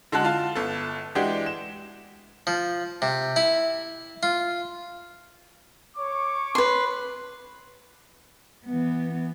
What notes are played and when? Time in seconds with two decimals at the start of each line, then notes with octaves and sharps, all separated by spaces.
0.12 D3 G#3 F#4 A5 F#6
0.24 F4 F5 A5
0.55 G1 A4
1.15 E3 G#3 D4 F#4 G4
1.46 E7
2.47 F3
3.02 C3
3.36 E4
4.23 F4
5.97 C#5 C#6 D6
6.55 B4 C6
8.66 E3 B3